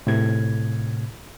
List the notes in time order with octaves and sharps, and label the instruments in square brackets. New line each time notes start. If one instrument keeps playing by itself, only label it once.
[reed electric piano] A2 C3 G#6